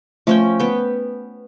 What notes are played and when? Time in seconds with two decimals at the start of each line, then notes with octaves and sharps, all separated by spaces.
0.27 F3 A3 C#4 G5
0.59 B3 G5